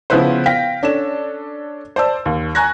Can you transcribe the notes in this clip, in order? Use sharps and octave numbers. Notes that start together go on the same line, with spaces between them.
C#3 F3 B3 E4 B4 C5
F5 G5 A#6 B6
C#4 D4 A4 E7
C5 D5 A5 E6
D#2
G#5 A#5 C#6 F#6 G#6 A#6